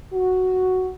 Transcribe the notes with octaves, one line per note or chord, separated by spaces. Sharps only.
F#4